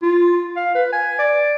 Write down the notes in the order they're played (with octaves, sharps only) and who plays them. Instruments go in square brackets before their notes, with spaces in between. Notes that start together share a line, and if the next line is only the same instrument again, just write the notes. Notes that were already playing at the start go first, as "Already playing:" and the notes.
[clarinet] F4
F5
B4
G#5
D5